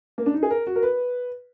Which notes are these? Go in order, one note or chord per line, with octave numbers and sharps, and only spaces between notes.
A#3
D4
D#4
G#4
A#4
F#4
A#4
B4